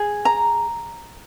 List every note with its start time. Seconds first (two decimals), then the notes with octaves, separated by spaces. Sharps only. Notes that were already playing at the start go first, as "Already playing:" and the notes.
Already playing: G#4
0.25 A#5